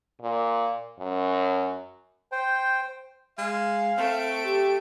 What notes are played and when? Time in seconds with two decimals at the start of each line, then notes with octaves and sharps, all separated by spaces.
0.22 A#2
1.00 F#2
2.32 C5 G5
3.38 G#3 F5
3.97 A3 C4 D7
4.44 G4